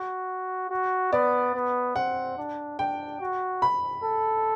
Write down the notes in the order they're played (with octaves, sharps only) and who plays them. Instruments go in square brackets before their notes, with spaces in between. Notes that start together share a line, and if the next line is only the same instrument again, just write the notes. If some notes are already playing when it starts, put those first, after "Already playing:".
Already playing: [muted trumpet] F#4
F#4
[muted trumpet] B3 [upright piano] D5
[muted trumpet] B3
[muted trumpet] C4 [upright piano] F#5
[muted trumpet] D4
[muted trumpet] D4 [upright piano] G5
[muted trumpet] F#4
[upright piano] B5
[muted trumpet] A4